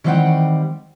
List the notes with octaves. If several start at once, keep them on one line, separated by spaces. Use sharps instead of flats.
D#3 E3 G3 C4 F#5 G5